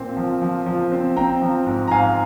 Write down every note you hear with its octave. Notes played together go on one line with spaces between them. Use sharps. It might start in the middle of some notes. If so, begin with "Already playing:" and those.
Already playing: A#2 C4
F3
F3
F3
C4
C4 G5 A#5
F3
G#2
A#5
G#2 F5 G#5